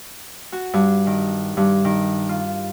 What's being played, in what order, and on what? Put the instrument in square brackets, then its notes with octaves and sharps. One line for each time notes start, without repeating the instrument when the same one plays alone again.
[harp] F#4
G2
D#3
G2
D#3
F4